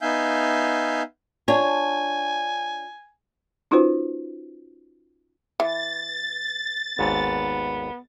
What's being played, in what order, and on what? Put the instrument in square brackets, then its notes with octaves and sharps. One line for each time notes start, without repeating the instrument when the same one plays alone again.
[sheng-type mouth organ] B3 D#4 E5 F5 G#5 G6
[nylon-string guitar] D4 F4 C#5 [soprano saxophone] G#5
[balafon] C#4 D#4 F4 F#4 B4 C5
[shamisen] E3 [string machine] A6
[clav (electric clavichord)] G#1 D#2 G#2 [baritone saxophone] B3